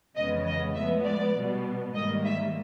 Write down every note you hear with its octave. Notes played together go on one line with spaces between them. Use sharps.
F2 C#3 E3 G#3 B3 D#5
D#5
A2 F3 G#3 B3 E5
D5
B2 G3 B3
G#2 D#3 G3 A#3 D#5
E5